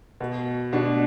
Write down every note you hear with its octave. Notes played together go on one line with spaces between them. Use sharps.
B2
B2 D4